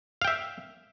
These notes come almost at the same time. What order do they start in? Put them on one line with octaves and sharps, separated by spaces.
F5 G5 E5